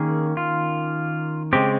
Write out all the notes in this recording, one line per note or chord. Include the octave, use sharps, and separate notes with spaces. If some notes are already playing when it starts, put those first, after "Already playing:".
Already playing: D#3 A#3 C#4 G#4
F4
C#3 G#3 C4 G4